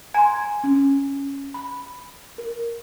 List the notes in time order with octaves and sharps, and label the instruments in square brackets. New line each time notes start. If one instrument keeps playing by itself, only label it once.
[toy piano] G#5 A#5 [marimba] C6 G#6
[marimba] C#4
B5
A#4